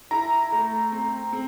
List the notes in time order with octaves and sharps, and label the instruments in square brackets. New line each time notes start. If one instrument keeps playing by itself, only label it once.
[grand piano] E4 [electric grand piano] A#5
[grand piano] A3
C4
C4